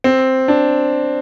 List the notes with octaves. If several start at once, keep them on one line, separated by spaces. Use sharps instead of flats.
C4
D4